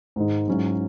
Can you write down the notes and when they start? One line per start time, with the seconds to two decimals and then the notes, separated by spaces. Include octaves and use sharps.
0.16 G#2 D#3 G#3 D#4
0.48 G#2 F#3 C#4 E4